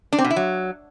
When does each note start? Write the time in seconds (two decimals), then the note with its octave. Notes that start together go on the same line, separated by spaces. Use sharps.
0.13 D4
0.18 C4
0.24 B2
0.30 E4
0.36 F#3